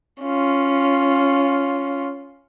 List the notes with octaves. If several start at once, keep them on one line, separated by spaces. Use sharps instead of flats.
C#4 F4